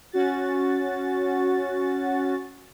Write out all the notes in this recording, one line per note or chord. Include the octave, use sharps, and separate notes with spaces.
C#4 F#4 A6